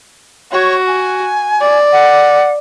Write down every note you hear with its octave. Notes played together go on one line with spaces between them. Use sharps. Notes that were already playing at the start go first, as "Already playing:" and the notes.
F#4 C#5
G#5
D5
F#5